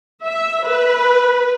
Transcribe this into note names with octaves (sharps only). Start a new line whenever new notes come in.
E5
B4